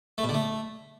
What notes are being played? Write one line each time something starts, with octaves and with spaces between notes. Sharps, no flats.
A3
B2
D3
A3